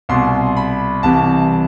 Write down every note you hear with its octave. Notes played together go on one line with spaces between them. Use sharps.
C2 B2 C6
B5
C2 C3 E3 A5